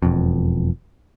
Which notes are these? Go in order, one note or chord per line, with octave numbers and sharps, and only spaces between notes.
E1 F2